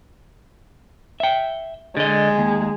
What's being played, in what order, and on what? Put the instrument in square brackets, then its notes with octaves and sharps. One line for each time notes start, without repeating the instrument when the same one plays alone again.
[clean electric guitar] E5 G5
[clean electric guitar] D3 D#5 [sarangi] G#3
[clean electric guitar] D#2